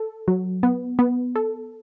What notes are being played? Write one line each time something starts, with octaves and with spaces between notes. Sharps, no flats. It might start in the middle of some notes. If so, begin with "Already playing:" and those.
Already playing: A4
F#3
B3
B3
A4